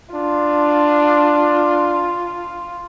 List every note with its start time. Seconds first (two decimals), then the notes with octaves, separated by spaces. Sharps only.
0.15 D4 F4